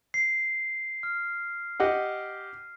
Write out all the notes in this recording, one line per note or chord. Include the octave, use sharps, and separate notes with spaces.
C7
F6
G4 D#5 F#5